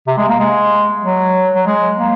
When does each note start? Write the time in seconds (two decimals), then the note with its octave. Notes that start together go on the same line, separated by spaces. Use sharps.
0.07 C3
0.17 G#3
0.28 A#3
0.39 G#3
1.02 F#3
1.55 F#3
1.66 G#3
1.98 A#3